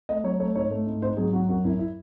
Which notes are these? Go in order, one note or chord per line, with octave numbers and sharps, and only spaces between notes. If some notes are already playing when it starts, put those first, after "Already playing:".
A3 D#5
F#3 C#5
A3 C#5
G#2 C#5
A3
G#2
G#2 C5
F#3 G#4
F#3 F#4
F#2 F#4
F#2 E4
E4